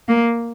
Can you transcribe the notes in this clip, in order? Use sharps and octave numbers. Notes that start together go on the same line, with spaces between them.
A#3